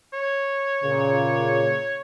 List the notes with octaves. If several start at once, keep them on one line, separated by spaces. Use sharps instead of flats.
C#5
A#2 C#3